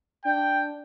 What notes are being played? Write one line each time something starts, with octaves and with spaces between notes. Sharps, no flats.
D4 G5